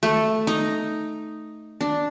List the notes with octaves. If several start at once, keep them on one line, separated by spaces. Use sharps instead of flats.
A3
D#4
D4